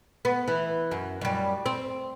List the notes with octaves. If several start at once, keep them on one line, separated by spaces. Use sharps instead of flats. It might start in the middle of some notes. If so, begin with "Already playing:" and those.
B3
E3
F#2
F#2 G3
C4